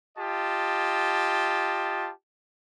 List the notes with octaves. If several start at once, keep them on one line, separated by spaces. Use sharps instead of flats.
F4 G4 D#5 A5